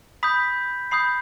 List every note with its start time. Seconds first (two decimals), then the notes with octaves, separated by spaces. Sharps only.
0.23 B5 D#6 G6 B6
0.91 B5 D#6 G6 C7